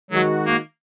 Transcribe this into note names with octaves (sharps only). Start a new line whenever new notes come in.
D#3 F#3 G#3 D#4 F#4
A#3